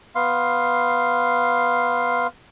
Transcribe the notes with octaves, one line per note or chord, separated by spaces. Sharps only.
B3 F5 C6